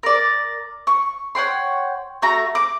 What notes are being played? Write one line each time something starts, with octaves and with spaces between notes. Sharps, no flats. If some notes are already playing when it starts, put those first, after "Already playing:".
A#4 D5
C#6
C#5 F#5 G5 C6
A3 F#4 A#5
D6